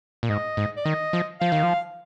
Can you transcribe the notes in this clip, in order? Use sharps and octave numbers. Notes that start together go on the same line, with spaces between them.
A#2
G#2 D#5
G#2
D5
D#3 D#5
F3
F3 F5
D#3
F3